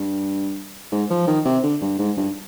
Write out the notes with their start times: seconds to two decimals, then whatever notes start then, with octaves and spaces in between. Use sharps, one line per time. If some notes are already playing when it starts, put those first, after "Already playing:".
Already playing: G2
0.92 G#2
1.10 F3
1.27 D#3
1.45 C3
1.63 D3
1.81 G2
1.99 G#2
2.16 G2